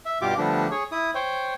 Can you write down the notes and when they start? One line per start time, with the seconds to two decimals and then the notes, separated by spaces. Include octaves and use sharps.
0.05 E5
0.22 G2 B2 F4 G4 D6
0.38 D3 F3 G3 A3 B3 D4
0.71 G#4 C#5
0.92 E4 D#6
1.15 C5 C#5 G5